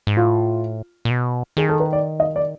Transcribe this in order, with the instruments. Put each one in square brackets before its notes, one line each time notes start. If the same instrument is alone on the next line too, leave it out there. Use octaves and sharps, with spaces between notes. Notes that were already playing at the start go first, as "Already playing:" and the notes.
[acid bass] G#2
[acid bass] A2 [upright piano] F4
[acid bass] A#2
B2
[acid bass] D#3 [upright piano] G#4
[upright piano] A4
B4
D5
D#5
D5